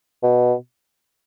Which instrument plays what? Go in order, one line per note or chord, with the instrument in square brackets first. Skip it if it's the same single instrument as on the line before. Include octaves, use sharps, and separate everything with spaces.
[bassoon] B2